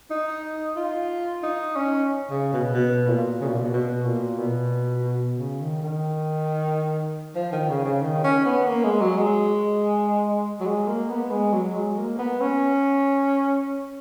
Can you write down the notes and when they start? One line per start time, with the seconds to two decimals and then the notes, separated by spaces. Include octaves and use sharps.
0.11 D#4
0.76 F4
1.43 D#4
1.76 C#4
2.30 C#3
2.53 B2
2.74 B2
3.07 A#2
3.41 C#3
3.48 B2
3.54 A#2
3.61 B2
3.73 B2
4.06 A#2
4.39 B2
5.38 C#3
5.61 D#3
5.83 D#3
7.35 F3
7.53 D#3
7.69 C#3
7.85 C#3
8.02 D#3
8.24 C#4
8.46 B3
8.67 A#3
8.84 G#3
9.01 F#3
9.18 G#3
10.60 F#3
10.66 G#3
10.87 A#3
11.09 B3
11.31 G#3
11.53 F#3
11.75 G#3
11.97 A#3
12.19 B3
12.41 C#4